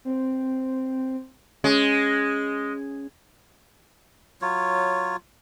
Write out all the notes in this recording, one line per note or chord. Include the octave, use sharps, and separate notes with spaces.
C4
G#3 C#4
F#3 F4 C#5